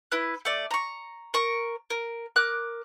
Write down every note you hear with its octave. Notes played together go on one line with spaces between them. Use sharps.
E4 B4 F#6
A3 D5
A#5 C#6
A#4 C#6
A#4
A#4 D6 F#6